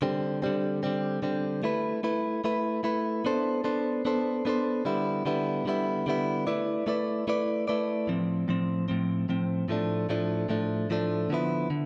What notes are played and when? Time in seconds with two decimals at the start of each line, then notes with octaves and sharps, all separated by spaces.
0.02 D3 G3 C4
0.42 D3 G3 C4
0.83 D3 G3 C4
1.23 D3 G3 C4
1.63 A3 E4 B4
2.03 A3 E4 B4
2.44 A3 E4 B4
2.84 A3 E4 B4
3.25 B3 D4 A4 C5
3.64 B3 D4 A4 C5
4.05 B3 D4 A4 C5
4.45 B3 D4 A4 C5
4.85 D3 G3 B3 E4
5.26 D3 G3 B3 E4
5.66 D3 G3 B3 E4
6.06 D3 G3 B3 E4
6.47 A3 E4 B4 D5
6.87 A3 E4 B4 D5
7.28 A3 E4 B4 D5
7.68 A3 E4 B4 D5
8.07 A2 F3 C4
8.48 A2 F3 C4
8.88 A2 F3 C4
9.29 A2 F3 C4
9.68 A2 F3 A3 D4
10.09 A2 F3 A3 D4
10.49 A2 F3 A3 D4
10.90 A2 F3 A3 D4
11.30 D3 F3 B3 E4
11.70 D3